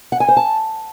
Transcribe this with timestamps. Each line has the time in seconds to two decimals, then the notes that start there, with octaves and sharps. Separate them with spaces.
0.12 F#5
0.20 G#5
0.28 C5
0.37 A5